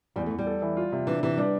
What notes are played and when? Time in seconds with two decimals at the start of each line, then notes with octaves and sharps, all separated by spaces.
0.16 E2 G3
0.26 E2 A3
0.39 G3
0.46 A4
0.62 E3
0.77 F4
0.92 C3
1.07 E3 D4
1.23 C3 E3
1.38 G3 D4